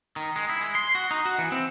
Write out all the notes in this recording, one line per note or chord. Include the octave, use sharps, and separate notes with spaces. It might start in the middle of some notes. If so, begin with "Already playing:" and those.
D#3
G#3
E4
G#3
C6
F#4
D#4
F#4
E3
C4